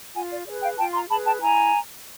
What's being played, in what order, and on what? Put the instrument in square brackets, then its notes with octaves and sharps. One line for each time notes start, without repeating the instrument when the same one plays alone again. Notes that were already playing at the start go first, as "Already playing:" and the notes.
[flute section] F4 F#5 G#5
D5
G#4 B4 D5
F5 G5
F4 G5 A5
A#5 C6
G#4 A5 B5
B4
G5 A5
E4 G#5 A#5